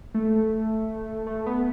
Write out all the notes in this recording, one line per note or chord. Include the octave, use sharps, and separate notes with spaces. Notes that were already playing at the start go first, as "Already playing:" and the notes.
A3
A3
B3